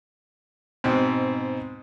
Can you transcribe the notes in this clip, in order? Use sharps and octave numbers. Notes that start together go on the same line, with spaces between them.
G#2 B2 C4